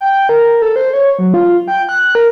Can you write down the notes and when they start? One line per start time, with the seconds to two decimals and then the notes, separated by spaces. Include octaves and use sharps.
0.01 G5
0.29 A#4
0.62 A4
0.76 C5
0.93 C#5
1.19 F#3
1.34 F4
1.68 G5
1.89 F#6
2.15 A#4